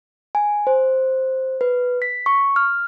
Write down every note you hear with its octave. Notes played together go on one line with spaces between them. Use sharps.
G#5
C5
B4
B6
C#6
F6